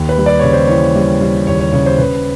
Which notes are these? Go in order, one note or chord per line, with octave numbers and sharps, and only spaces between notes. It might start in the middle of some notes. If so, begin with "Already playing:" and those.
Already playing: D#2
B4
G3
D5
C#3 C#5
C5
E3 C#5
G3
G3
D#2 C#5
C#5
C#3 C#5
C5
C#3 B4